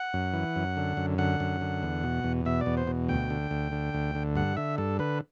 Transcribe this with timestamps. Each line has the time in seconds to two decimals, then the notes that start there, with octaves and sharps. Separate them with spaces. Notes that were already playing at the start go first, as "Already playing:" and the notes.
Already playing: F#5
0.14 F#2
0.34 E3
0.56 F#2
0.77 D3
0.97 F#2
1.18 D3 F#5
1.40 F#2
1.61 D3
1.83 E2
2.03 B2
2.24 E2
2.46 B2 E5
2.61 D5
2.66 E2
2.77 C5
2.87 B2
3.09 D2 G5
3.30 D3
3.51 D2
3.72 D3
3.94 D2
4.15 D3
4.35 G2 F#5
4.57 D3 E5
4.78 G2 A4
4.99 D3 B4